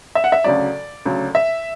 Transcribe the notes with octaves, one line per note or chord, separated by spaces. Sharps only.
E5
F#5
E5
D2 C#3 F#3 D5
D2 C#3 F#3
E5